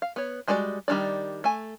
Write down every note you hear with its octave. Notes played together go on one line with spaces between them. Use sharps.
F5
B3 C#5
G3 G#3 D4 F#4 D5
D#3 G3 C#4 D4 D5
A3 G#5